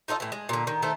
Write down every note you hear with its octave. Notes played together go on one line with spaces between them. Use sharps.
D#4 F4 A4 D#5
A2 E3
G#3
A#2 D3
D#3
D#3 A3 A4 C5